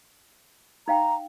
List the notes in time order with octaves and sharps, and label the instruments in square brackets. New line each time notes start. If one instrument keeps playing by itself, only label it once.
[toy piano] D#4 F5 G5 [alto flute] A#5